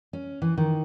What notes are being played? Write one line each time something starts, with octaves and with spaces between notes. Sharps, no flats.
C#4
E3
D#3